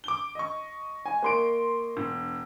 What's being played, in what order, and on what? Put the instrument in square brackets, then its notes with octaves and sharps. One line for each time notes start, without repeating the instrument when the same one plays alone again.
[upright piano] D6 G7
D#5 C#6
[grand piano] G#5
A#3 C6 D7
[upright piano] E1